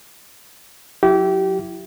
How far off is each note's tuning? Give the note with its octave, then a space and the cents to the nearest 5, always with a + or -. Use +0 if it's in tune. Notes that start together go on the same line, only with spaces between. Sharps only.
F#3 -25 E4 +20 G4 -25